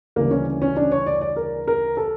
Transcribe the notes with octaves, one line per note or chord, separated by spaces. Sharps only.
D2 C#3 E3 G3 A#3
C#4
C#4
D4
C#5
D5
D5
A#4
A#4
A4